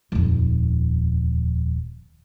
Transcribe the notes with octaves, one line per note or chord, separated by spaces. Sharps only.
D#1 F2